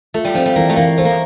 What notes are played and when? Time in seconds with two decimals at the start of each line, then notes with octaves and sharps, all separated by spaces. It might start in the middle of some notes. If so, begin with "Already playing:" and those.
0.14 A3 F4
0.25 G3
0.35 F3 C4
0.46 G3
0.56 E3 A#3
0.69 A3
0.76 E3 A#3
0.98 A3 C5
1.05 A#3